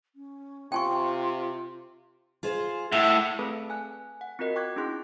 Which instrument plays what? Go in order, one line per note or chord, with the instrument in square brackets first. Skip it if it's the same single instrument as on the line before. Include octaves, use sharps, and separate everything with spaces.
[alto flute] C#4
[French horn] C3 [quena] F4 [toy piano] G5 G#5 C#6 [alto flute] C6
[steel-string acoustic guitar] F4 G#4 C5
[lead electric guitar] A2 [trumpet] E5 [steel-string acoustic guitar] F#5
[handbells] A3 C4 G#4 A4 B4 A5
G#5 F#6
F#5
C4 F4 F#4 A#4 D#5
G5 C#6 D6 F#6 G#6
C#4 D4 E4 G#4 C6 F#6